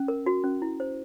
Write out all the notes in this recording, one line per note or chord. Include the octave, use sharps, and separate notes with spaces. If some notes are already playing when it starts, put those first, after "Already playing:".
Already playing: C#4
A#4
F#4
C#4
E4
C5